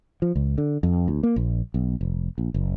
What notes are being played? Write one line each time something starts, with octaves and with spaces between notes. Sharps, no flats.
F3
C#2
D3
F2
D2
A#3
A#1
B1
F1
A#1
F#1